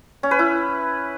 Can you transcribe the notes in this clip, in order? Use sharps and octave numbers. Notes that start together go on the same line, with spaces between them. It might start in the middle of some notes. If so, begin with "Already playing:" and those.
C#4
B4
E4